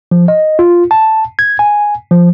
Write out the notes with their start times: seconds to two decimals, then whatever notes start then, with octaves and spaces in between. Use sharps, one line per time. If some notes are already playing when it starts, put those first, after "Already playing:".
0.11 F3
0.28 D#5
0.59 F4
0.91 A5
1.39 G#6
1.59 G#5
2.11 F3